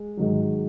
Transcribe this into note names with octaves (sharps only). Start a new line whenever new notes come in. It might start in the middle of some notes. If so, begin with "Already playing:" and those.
Already playing: G#3
G#2 D#3 F#3